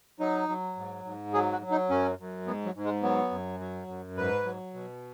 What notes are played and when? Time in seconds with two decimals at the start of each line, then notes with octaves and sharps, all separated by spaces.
0.20 F#3 D#4
0.49 F#3
0.76 G#2
1.05 G#2
1.33 F#3 G#4
1.52 F#4
1.61 F#3
1.71 D#4
1.89 F#2 C#4
2.19 F#2
2.46 G#2 B3
2.66 F#3
2.75 G#2
2.84 G#3
3.03 F#3 B3
3.31 F#2
3.60 F#3
3.88 F#2
4.17 G#2 B4
4.45 F#3
4.74 B2